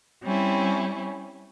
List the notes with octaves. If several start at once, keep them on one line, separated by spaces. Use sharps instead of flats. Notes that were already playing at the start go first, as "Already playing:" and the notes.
G3 C4 C#4 E4